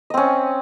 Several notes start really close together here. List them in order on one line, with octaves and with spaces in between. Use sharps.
D#5 C4 C#4